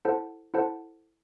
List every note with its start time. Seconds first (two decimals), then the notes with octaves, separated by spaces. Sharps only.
0.05 E4 A4 C5 F#5 A5
0.54 E4 A4 C5 F#5 A5